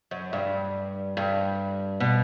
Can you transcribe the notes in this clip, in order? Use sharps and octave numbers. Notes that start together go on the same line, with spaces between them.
F#2
G2
G2
B2